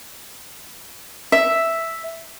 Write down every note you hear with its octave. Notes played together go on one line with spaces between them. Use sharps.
E5